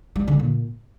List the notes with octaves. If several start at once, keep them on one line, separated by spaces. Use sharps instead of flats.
G3
D3
A#2